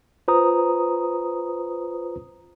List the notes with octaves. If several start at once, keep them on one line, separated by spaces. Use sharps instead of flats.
F4 B4 C5 A#5 D#6